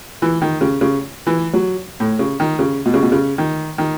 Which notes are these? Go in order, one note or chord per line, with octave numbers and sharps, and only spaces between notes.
E3
D#3
C#3
C#3
E3
F#3
A2
C#3
D#3
C#3
B2
C#3
B2
C#3
D#3
D#3